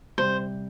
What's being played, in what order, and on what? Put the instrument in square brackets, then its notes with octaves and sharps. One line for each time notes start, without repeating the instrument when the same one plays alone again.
[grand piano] C3 G3 [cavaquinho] C5